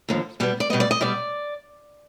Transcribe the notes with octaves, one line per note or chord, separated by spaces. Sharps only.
D#2 D3 F3
B2 G3 B3
D5
B2 G3 B3 D#5
D5
D#5
B2 G3 B3 D5